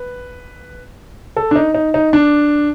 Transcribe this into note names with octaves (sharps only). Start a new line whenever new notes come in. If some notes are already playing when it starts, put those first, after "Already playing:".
Already playing: B4
A4
D4
D#4
D#4
D#4
D4